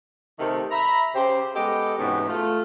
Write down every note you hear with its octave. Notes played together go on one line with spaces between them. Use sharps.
C3 D#3 A3
E5 A#5 B5
C#3 G4 C5
G#3 B3 G4 A4 D#5
G#2 C3 E3 B3 C#4 F#4
A3 F4